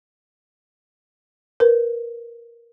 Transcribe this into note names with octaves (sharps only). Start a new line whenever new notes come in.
A#4 B4